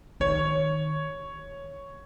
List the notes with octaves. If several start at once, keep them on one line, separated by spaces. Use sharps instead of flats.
D#3 C#5